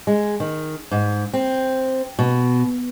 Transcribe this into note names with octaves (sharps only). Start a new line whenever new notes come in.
G#3
D#3
G#2
C4
B2